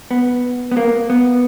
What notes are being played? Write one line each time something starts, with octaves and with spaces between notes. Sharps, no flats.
B3
B3
A#3
B3